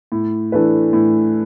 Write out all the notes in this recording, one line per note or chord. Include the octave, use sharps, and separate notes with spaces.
A2
E3 A3 D4 B4
A2